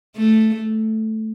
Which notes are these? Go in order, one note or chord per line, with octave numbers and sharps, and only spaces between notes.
A3